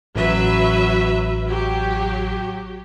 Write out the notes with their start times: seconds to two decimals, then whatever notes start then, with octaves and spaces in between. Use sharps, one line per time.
0.16 A1 F#3 B4 E5
1.45 F#3 G4